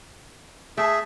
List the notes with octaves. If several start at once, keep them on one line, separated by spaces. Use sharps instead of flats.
A3 G#4 E5